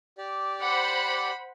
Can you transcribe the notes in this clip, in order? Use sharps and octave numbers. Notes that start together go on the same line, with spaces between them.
G4 D5
C5 F#5 B5